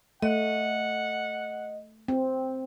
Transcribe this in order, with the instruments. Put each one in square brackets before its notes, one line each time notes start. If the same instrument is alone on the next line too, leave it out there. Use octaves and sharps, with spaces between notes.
[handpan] A3 [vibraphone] D#5 [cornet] F#5
[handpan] C4